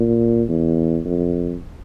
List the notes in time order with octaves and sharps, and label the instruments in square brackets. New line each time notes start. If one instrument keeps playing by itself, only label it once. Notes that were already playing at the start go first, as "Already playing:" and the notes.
Already playing: [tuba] A#2
E2
F2